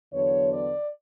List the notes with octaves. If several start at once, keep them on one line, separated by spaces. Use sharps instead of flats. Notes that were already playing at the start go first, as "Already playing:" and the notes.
E2 D3 F#3 B3 C#5
D5